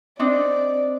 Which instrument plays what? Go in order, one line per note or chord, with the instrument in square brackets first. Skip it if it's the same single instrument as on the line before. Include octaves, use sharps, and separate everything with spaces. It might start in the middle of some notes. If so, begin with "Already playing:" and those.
[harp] C4 D4 D#4 [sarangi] D5